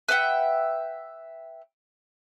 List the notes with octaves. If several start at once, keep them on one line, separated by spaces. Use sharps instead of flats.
B4 E5 F#5 G5